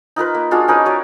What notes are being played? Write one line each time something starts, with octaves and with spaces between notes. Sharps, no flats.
D#4 F4 A#4 B4
A#3
G#3 D4 F4 F#4
C#4 D#4 A#4 B4
F#4 C#5 D5